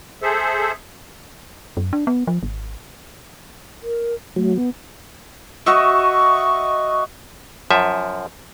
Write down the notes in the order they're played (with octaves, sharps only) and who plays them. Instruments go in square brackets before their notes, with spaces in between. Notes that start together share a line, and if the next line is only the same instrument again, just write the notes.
[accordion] G#4 A4 C5 E5
[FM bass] F#2
D4
B3
F3
G#1
[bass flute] A#4
[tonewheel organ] F#3 [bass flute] A3
[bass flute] B3
[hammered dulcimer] F#4 D#5 E5 [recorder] C#6
[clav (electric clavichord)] F#2 F3 E5